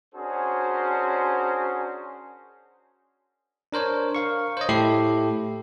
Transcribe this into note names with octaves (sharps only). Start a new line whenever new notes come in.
C#4 D4 F#4 G#4 A#4 C5
D4 A#4 C5 C#5
A#4 F5 C#6
C5 C#5 D#5
A2 E4 G4 A4 C7